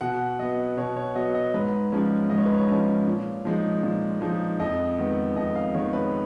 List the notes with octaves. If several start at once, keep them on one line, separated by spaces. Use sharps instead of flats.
B2 F#5
F#3 B3 D#5
B2 C#5
C#5
F#3 B3 D#5
D#5
G#2 B4
F3 G#3 C#4
G#2 D#5
C#5
B4
C#5
F3 G#3 C#4 C#5
A#2
F3 G#3 D#4
A#2
F3 G#3 D#4
F2 D#5
D#3 G#3 B3
F2 D#5
F5
D#3 G#3 B3 C#5
B4